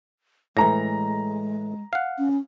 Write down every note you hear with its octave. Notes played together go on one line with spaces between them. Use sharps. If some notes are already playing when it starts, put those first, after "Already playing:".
A2 E3 G#3 A#5 A#6
F5 F#5
C#4